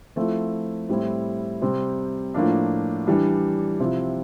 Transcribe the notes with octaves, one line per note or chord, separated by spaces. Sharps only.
F3 A3 C4 E4
A2 G3 C4 E4
C3 G3 C4
A2 F3 A#3 D4
E3 G3 D4
C3 F3 C4 E4